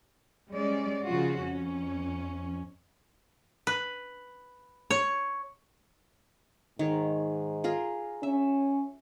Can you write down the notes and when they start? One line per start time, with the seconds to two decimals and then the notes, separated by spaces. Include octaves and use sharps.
0.51 G3 G#3 C#4 D5
1.05 C#3 F3 F4 F#4
1.43 F2 C#4
3.67 B4
4.91 C#5
6.79 G#2 D#3 C#5
7.64 F4 G#4 A#4
8.23 C#4 E5